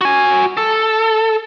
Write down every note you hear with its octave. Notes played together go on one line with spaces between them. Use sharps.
F#4 G#5
A4